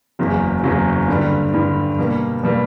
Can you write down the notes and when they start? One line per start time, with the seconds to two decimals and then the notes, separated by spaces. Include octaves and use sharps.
0.19 F#1 E2 C#3 F#3
0.64 F#1 E2 C#3 F#3
1.08 G2 D3 G3
1.53 G2 D3 G3
1.99 B2 G3 A#3
2.43 B2 G3 A#3